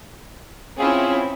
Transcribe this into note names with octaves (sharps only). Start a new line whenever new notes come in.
C4 C#4 E4 F4 G#4